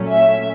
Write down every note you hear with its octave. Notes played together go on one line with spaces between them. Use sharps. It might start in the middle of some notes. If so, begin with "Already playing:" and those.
Already playing: A#2 F#3 A3 C#4
E5